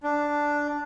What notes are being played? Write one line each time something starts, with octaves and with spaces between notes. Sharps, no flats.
D4